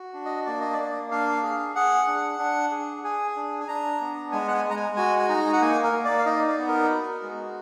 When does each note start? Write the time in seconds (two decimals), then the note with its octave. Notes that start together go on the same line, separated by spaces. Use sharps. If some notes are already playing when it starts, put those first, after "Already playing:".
Already playing: F#4
0.14 D4
0.25 D#5
0.46 A#3 D5
0.60 D#5
0.73 A#3 D5
1.11 D4 F5
1.43 G#4
1.76 G#4 F#5
2.08 D4
2.39 D4
2.72 G#4
3.04 G#4 G#5
3.36 D4
3.60 G#5
3.68 D4 A#5
4.01 B3
4.32 G#3 G#5
4.48 F#5
4.54 G#5
4.65 G#3
4.70 A#5
4.76 G#5
4.96 F#4 G#5
5.19 G#5
5.29 D#4 A#5
5.53 F#5
5.61 A#3 G#5
5.83 A#4
5.93 A#3
6.05 D5
6.18 F5
6.26 D#4 D#5
6.48 D5
6.58 B3
6.68 A#4
6.91 F#4
7.22 G#3